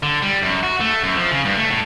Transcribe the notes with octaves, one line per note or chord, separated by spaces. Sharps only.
D3
G3
F#2
F#4
A3
F#2
F3
C#3
G2
A3
A2